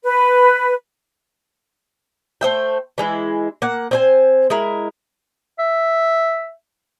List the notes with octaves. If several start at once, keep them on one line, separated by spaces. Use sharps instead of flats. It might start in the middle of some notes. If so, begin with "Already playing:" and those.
B4
A3 C5 E5 G5
E3 G#3 E4
A#3 F#5
C4 C5 G#5
G#3 E4 A#4
E5